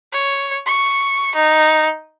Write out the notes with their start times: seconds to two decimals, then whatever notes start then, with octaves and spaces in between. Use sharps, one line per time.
0.13 C#5
0.66 C#6
1.35 D#4